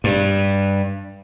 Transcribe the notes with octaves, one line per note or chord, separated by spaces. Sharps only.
G2